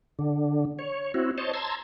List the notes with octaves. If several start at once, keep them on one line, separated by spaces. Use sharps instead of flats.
D3
C#5
C4 E4 F#4
C5 C#5 D#5 A5
A5 A#5 C6 E6 G#6